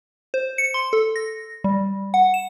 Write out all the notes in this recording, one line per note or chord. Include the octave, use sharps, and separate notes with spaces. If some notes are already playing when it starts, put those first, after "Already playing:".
C5
C#7
C6
A4
A#6
G3
F#5
E7